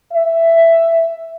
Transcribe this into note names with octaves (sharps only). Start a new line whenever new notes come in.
E5